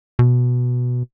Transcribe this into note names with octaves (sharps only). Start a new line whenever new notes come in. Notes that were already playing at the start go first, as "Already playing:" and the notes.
B2